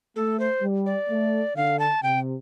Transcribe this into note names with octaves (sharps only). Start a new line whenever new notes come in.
A3 A4
C5
G3
D5
A3
D3 F5
A5
C3 G5